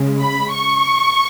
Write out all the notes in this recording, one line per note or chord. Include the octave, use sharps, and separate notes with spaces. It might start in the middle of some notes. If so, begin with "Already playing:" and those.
Already playing: C#3 G#3
B5
C#6